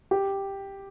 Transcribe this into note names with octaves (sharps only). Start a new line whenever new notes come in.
G4